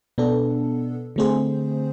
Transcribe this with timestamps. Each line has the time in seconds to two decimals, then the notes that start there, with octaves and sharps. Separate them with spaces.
0.18 B2 B3 D4 A4
1.16 D3 A3 C4 G#4 C5